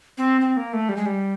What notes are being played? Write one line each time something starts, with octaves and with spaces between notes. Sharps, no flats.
C4
C4
A#3
A3
G3
G#3
G3